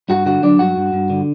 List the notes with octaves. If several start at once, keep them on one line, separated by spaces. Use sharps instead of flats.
G2 F#4 F#5
D3 F#4 F#5
F#3 D4 D5
G2 F#4 F#5
G2
G2
D3